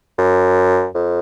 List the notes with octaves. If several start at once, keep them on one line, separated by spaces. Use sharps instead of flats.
F#2
F2